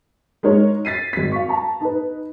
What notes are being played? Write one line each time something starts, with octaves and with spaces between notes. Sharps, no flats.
G#3 D#4 A#4 C#5
A6 B6 C7 D#7
G#1 B6
F5 C#6
A5 A#5
D#4 B4